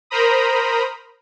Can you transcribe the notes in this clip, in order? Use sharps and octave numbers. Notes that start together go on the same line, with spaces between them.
A#4 C5 A#5 B5 D#6